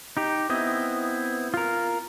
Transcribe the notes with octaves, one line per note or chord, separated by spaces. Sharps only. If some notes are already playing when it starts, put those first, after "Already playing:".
D#4 G4
B3 C4 E4 D#5
F4 A#4